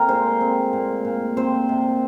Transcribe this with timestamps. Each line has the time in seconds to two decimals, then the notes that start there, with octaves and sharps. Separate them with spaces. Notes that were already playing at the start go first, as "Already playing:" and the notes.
Already playing: A#2 C4 A#4 F5
0.08 G#3 C5
0.41 C4
0.73 A#2
1.05 A#2
1.37 C4 C5
1.69 C3